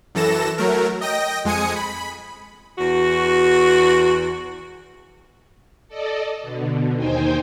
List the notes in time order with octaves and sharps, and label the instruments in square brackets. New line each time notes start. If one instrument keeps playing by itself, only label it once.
[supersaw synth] F#2 E3 A4 A#6 E7
F#3 A3 A#4
D#5 G5 A#6
F2 G#3 G#5 D#6 C#7
B5
[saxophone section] E2 F#4
[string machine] A4 D5 D#5
B2 D3
D#2 D#4 C5 G5 G#5